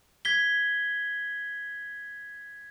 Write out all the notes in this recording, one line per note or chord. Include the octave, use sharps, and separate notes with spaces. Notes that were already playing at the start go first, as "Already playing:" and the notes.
G#6 B6 G7